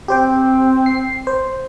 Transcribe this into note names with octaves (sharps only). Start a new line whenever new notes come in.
C4 G4 C5 G5
C7
C5